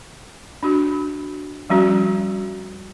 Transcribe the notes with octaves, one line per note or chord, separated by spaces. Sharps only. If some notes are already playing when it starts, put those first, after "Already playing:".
D4 F#4
F3 G3 C#4 F#4